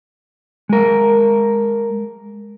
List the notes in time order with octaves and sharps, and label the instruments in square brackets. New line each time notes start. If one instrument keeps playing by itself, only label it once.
[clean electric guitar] G#3 A#4